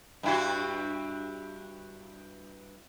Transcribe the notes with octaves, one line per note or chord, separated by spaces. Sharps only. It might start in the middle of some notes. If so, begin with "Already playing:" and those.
G2 E4 F#4